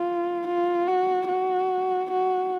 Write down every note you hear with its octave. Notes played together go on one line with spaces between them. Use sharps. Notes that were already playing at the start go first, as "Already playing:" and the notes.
Already playing: F4
F4
F#4
F#4
F#4